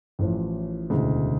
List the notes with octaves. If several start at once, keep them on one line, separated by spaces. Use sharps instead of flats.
A1 A2 F3
E1 D2 C#3 E3 G#3